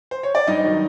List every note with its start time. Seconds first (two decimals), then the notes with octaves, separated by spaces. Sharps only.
0.11 C5
0.23 C#5
0.35 D5
0.47 G2 D#4 D#5
0.64 D#3 F#3